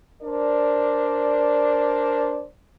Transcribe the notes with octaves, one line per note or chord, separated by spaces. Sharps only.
D4 A#4 C5 D5